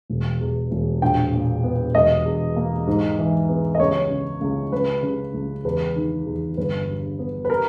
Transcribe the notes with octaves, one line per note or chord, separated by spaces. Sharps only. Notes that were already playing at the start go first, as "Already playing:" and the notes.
E1
E2
E1
A#1 G5
A#2
B3
E1 D#5
E2
A#3
G#2
E3
B3
D#5
C#2 C#5
C#3
C#2
C#2 B4
C#3
C#2
E2 B4
D#3
E2
G1 B4
G2
B3
B4
A#4